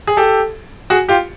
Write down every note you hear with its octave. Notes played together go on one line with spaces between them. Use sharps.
G#4
G4 A4
F#4 G#4
F4 G4